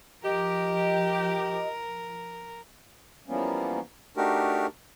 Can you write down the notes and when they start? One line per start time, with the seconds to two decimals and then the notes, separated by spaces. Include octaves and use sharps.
0.24 F3 G4 A#4 D#5
3.28 E3 F3 G3 A#3 B3 C#4
4.17 A3 D4 D#4 F#4 G4 A#4